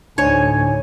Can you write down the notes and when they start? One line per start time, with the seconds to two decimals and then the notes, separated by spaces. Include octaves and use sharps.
0.18 D2 A2 D3 D4 D#4 C#5 G#5